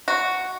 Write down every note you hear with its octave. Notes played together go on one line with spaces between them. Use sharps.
F#4